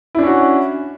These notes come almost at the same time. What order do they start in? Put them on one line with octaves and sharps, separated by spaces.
E4 D4 C#4 F#4